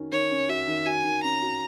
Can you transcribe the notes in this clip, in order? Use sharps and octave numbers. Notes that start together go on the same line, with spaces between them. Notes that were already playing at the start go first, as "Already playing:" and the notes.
Already playing: D#3 C#4 F#4
D#3 C#5
C#4
F#4 E5
D#3
F#4 G#5
D#3
C#4 A#5
F#4